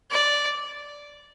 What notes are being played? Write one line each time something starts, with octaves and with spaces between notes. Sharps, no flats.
D5